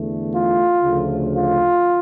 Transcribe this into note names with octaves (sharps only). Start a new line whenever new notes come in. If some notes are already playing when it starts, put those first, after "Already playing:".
Already playing: E2 D3 A3
F4
D2 C#3 F3 A3
F4